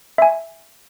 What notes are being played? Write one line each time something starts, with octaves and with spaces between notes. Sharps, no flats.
E5 G#5